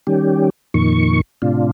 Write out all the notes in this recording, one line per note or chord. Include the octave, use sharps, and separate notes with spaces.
D#3 G3 C#4 G4
F2 A#2 D#3 C#6
A2 C3 D4 F4